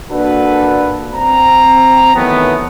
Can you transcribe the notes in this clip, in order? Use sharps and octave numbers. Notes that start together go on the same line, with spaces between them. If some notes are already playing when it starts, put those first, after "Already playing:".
A#3 D4 F#4 A4 B4
C4 A#5
D#3 E3 F#3 A3 B3